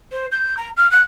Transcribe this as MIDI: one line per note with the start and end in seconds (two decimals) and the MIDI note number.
0.12 0.26 72
0.31 0.55 91
0.57 0.69 82
0.77 0.89 89
0.91 1.01 90